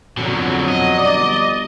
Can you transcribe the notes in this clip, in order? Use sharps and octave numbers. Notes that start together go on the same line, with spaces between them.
F2 B2 D3 F#3
D#5
G1 D5